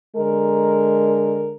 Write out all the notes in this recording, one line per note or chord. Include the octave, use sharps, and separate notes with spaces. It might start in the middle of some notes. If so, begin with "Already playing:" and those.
D3 G#3 A#4